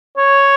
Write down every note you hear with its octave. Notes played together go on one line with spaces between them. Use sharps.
C#5